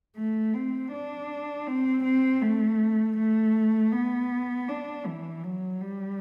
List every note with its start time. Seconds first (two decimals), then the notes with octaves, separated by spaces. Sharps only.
0.17 A3
0.54 C4
0.92 D4
1.67 C4
2.04 C4
2.42 A3
3.18 A3
3.92 B3
4.68 D4
5.06 E3
5.43 F#3
5.81 G3